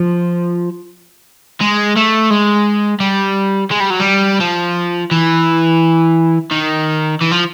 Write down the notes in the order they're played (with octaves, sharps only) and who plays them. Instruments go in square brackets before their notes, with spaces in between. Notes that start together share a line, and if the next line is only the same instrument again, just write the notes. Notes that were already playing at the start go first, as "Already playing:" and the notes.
Already playing: [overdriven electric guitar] F3
G#3
A3
G#3
G3
G#3
G3
F#3
G3
F3
E3
D#3
E3
F3